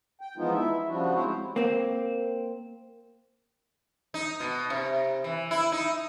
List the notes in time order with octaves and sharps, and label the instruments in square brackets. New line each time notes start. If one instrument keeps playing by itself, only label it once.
[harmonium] G5
E3 F3 G#3 B3 D#4 F4
E4 E5
C#3 F3 G3 D4 F#4
G#3 C4 E4 C5 C#5
[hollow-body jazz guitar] A#3 C4
[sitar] D#4
B2
C3
E3
E4
D#4